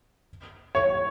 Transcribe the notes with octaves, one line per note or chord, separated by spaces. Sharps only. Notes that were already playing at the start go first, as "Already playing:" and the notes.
C#5